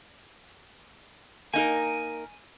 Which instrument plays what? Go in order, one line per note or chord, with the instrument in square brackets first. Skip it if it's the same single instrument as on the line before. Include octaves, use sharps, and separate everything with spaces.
[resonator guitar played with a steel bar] A#3 D#4 A#4 [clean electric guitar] G#5